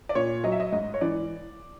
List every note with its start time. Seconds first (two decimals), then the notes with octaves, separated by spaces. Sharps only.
0.09 D5
0.15 A#2 C#5
0.44 F#3 D#5
0.52 E5
0.60 D#5
0.72 G#2 D#5
0.94 C#5
1.01 E3 D5